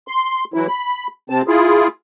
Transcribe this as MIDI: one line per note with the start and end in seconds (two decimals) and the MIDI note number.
0.08 0.44 84
0.54 0.67 52
0.54 0.67 54
0.54 0.67 64
0.68 1.07 83
1.30 1.42 48
1.30 1.42 60
1.30 1.42 81
1.48 1.88 64
1.48 1.88 65
1.48 1.88 68